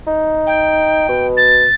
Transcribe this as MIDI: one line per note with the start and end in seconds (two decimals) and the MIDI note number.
0.07 1.04 63
0.46 1.26 79
1.09 1.66 47
1.37 1.74 93